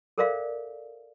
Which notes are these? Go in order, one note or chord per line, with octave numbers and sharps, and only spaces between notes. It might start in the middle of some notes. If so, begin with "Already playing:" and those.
A4 A#4 C5 D5 E5 F5